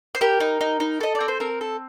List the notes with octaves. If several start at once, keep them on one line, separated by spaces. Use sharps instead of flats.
C5
G4 A#4
D#4
D#4
D#4
A4 D#5
D5
C4
C5
C4 A#4
A4